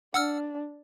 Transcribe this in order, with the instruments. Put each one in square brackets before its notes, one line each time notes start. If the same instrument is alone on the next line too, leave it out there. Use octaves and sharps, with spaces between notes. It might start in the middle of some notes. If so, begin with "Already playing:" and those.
[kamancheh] D4 [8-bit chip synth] F#5 E6 F6